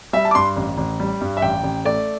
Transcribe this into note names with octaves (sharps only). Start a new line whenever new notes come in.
G3 E5
A5
D6
G2 C6
A1
A1
G3
G2
E5
A1 G5
A1
A3 D5